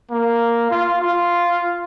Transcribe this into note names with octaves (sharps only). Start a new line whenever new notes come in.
A#3
F4
F4